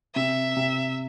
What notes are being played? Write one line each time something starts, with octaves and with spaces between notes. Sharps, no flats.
C3 E5
C3